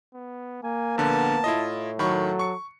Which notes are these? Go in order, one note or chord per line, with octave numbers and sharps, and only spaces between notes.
B3
A#3 G#5
A#1 D3 B3 A5
A2 E4 F4 D#5
D#3 F#3 A4 B5 C#6
C#6 C#7